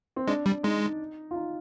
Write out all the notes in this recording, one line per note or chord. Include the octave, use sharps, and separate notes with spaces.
C4
G#3 D4
G3
G#3 D#4
F4
D#4